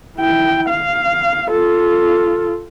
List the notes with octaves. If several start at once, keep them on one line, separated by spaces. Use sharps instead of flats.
E4 G5
F5
F4 A4